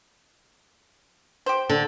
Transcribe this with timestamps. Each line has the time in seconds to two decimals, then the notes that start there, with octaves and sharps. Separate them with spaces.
1.46 G4 C5
1.69 D3